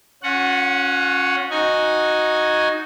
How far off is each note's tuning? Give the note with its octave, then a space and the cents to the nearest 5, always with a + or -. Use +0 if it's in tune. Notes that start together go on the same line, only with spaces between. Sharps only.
C#4 +0 F4 +45 F#5 +0
D#4 +0 F#4 -5 G#5 +0